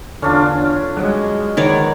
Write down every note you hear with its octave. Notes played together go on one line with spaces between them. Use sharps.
E2 D3 C#4 D4 F4
F#3 G#3
D#3 B3 C#5 D5